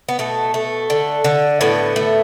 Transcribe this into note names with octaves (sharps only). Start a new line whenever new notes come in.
B3
B2 A3
A3
D3
D3
A2 B3
A3